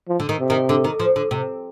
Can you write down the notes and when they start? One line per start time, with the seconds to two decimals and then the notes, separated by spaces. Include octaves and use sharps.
0.09 F3
0.20 D3
0.29 D#3
0.40 C3
0.50 D#3
0.69 D3
0.84 D#3
1.00 F3
1.16 D3
1.31 C3